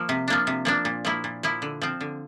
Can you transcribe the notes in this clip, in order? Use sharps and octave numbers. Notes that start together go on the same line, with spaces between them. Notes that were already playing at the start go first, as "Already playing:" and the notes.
Already playing: F3 A#3
C3
F3 A#3 D4
C3
F3 A#3 D4
A#2
F3 A#3 E4
A#2
F3 A#3 E4
D3
F3 C4
D3